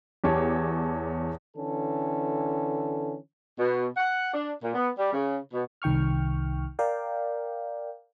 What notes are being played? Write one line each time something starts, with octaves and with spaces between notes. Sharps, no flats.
E2 G4 C#5 A5
D3 E3 C#4 A4
B2
F#5
D4
A#2
B3
G3
C#3
B2
C2 D#3 G5 C#6 F6
A#4 D5 F5 G5